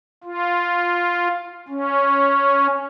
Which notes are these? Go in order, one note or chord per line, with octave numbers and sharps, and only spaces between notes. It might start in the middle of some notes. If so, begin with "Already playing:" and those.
F4
C#4